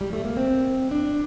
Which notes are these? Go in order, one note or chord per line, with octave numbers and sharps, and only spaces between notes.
G3
A3
A#3
C4
D4